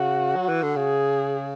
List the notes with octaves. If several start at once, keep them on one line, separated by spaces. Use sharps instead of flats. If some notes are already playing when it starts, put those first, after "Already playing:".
Already playing: C#3 F#4
F#3
E3
D3
C#3 G#4